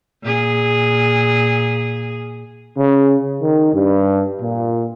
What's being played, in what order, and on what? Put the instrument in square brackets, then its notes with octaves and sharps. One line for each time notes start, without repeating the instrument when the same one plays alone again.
[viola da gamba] A#2 G#4
[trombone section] C#3
D#3
G2
A#2